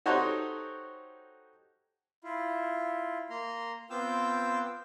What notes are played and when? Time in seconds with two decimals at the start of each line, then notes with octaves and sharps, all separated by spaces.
0.06 D#4 F#4 G4 A4 C5 C#5
2.23 E4 F4
3.30 A#3 A#5 C6
3.90 B3 C4 F4 G5 D6 E6